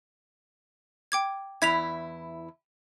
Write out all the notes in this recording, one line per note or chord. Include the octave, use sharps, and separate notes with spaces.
G5 D6 G#6
E2 E4 G#6 B6 F7